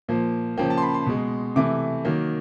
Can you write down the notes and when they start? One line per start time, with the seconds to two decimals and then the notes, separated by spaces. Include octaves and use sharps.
0.08 A#2 F3 A#3
0.57 C#3 F3 A#3 G5
0.70 A5
0.78 C6
0.82 B5
0.94 C6
1.06 B2 G#3
1.56 C3 E3 A3 D6
2.05 D#3 F#3 A#3